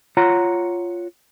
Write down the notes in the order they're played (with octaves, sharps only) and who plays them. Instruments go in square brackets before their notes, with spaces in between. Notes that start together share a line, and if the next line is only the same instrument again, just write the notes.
[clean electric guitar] F4 C#5 F#5 A#5